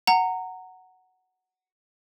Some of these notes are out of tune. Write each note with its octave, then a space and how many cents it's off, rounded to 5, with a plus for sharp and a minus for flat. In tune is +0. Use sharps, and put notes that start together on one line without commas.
F#5 +5 A#5 -20